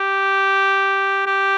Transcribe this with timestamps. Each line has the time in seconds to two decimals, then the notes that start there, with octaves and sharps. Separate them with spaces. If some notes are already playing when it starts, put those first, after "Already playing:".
Already playing: G4
1.26 G4